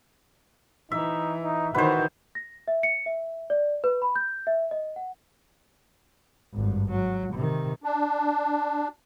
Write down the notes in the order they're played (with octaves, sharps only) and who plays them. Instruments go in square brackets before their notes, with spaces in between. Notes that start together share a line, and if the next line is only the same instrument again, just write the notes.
[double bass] E3 [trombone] D#4 [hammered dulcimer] E5
[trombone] D#4
[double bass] D#3 E3 [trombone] F#4 [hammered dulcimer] B4 C5
[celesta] A#6
E5
C#7
E5
D5
B4
B5
G6
E5
D#5
F#5
[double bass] G#1 G2
F#3
C3 D#3
[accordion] D4